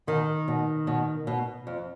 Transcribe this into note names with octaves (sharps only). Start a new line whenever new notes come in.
B2 D#3 D#4
B2
B2
B2
F2